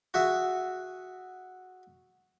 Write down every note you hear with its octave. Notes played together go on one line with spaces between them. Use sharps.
F#4 G#4 E5